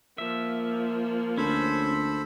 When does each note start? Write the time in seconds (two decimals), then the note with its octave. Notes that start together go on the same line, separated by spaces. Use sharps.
0.18 F3 A#3 E5
1.37 D2 C#4 A4 C5 B5